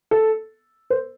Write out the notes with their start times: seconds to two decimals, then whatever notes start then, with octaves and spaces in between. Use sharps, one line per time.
0.11 A4
0.90 C5